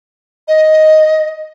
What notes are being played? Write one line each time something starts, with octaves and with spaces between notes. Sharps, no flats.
D#5